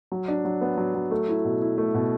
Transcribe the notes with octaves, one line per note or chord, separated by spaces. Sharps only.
F#3
D4
F#3
B3
F#3
F#3
A3
E4
B2
E4
A3
B2